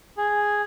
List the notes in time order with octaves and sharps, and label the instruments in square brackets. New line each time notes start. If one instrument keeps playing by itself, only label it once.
[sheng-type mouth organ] G#4